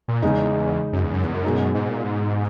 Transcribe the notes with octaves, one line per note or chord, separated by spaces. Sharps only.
A#2
E2 C#3 G#3 D#4
F#2
E2
F#2
E2
F#2
B2 G#3 D#4
G#2
A#2
G#2